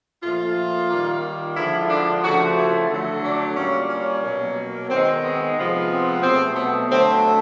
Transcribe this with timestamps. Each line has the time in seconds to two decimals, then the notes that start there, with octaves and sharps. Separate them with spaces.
0.23 A#2 F3 A3 F4
0.90 D#3 G3 A#3
1.57 D3 F3 G#3 E4
1.90 D4
2.23 C#3 F3 A3 F#4
2.57 E4
2.90 D3 F#3 A3
3.23 D4
3.56 A#2 G3 A#3 C#4
3.90 C#4
4.23 B2 F#3 A#3
4.90 D#3 G#3 B3 C4
5.23 B3
5.57 C3 F3 G#3 B3
5.90 C4
6.23 B2 F#3 A3 C4
6.56 B3
6.90 D3 F#3 A3 C4